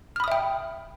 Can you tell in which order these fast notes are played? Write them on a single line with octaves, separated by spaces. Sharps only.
F6 B5 D#6 E5 G5